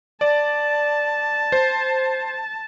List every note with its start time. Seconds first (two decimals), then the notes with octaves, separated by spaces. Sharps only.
0.21 D5 A5
1.52 C5